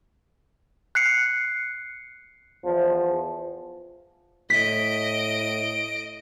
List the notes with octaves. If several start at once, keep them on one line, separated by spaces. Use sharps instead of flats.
F#6 C7 C#7
E2 F3
A2 D#5 B6 D7